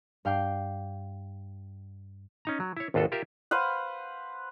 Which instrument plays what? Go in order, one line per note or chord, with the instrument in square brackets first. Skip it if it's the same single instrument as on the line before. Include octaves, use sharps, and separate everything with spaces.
[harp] G2 F5 G5 D6 C7
[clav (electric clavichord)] C#4 D#4 A#5
F#3
E4 C#5
G#1 D#2 F4 F#4 A4
F4 G4 A#4 E5
[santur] B4 C5 F5 F#5